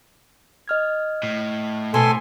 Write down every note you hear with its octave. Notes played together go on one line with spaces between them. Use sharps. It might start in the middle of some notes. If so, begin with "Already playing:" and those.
D#5 F6 G#6
A2
B2 A4 G#5 C6